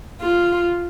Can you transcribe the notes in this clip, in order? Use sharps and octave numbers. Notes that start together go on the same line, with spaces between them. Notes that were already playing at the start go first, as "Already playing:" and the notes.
F4